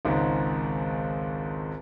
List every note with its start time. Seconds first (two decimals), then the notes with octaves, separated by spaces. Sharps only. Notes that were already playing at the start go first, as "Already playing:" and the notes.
0.05 G#1 C#2 G#2